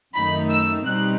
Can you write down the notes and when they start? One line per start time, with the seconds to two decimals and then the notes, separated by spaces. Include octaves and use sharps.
0.15 F#2 D#3 A3 D#4 B5
0.51 E6
0.86 B2 G3 C4 D#4 F#6